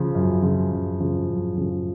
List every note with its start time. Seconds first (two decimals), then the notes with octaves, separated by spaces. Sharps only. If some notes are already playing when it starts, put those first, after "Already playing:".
Already playing: C#3 F3
0.15 F#2
0.42 C#3 F3
0.71 F#2
1.00 C#3 F3
1.29 F#2
1.57 C#3 F3